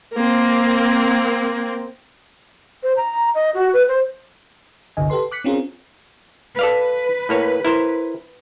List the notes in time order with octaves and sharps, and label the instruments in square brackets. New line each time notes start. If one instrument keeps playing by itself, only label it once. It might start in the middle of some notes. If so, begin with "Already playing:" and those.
[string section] A#3 C4
[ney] C5
A#5
D#5
F#4
B4
C5
[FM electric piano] G1 C2 D3 D#5 G#5
G4 A4 B4 C6
D6 F#6 B6 C#7
C4 C#4 F4 G#4 A#4
[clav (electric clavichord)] A4 D5 F5 [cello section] B4
[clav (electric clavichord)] A2 A#3 C#5
E4 A#4 C5